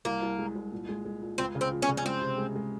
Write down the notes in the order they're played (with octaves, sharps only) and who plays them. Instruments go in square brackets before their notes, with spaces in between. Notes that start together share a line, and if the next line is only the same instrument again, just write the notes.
[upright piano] C2 [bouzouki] A#3
[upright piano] C2
G#3
C2
A#2
G#3
G#3
A#2
[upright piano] C#2 [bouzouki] C4
[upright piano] C#3
[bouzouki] C4
[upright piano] F3
[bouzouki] C#4
[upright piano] C#3
[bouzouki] C#4
[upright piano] G#3 [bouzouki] C4
[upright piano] C3
G#3
G#3